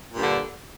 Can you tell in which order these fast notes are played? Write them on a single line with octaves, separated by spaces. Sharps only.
A#2 G2 D3